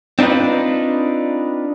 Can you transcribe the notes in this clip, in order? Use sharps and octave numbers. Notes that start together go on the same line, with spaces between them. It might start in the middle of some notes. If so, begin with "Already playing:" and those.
C4 D4 D#4 F4 B4